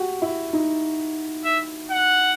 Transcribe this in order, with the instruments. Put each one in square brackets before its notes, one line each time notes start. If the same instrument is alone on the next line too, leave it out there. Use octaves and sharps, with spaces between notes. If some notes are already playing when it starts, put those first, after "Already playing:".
Already playing: [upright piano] F#4 G4
E4
D#4
[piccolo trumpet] E5
F#5